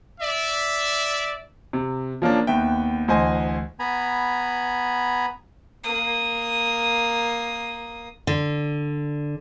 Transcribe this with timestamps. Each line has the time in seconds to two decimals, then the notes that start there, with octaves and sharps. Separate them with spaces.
0.20 D5 E5
1.73 C3
2.22 F3 A#3 C#4 D4
2.47 D#2 B3 E5 G5
3.08 D2 E3 C5 D#5 G#5
3.79 B3 G#5 A#5 B5
5.84 A#3 D#6
8.27 D3